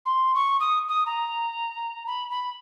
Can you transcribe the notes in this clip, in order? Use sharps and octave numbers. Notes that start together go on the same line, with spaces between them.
C6
C#6
D#6
D#6
A#5
B5
B5